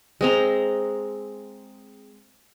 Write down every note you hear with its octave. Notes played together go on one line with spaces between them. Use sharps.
G#3 C4 A#5